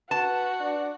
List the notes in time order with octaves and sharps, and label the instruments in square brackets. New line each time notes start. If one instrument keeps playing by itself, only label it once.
[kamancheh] F#4 [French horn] B4 [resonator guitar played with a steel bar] A5
[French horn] D4